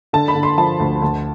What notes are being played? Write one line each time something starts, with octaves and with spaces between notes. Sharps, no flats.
D3 A5
B5
D3
C6
F3 A5
D2
D2